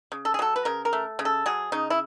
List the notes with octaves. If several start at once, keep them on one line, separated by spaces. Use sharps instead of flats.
C#3
A4
G#4
F#3 A4
B4
C#3 A#4
A#4
A3
C#3
A4
F#3 G#4
C#3 D#4
E4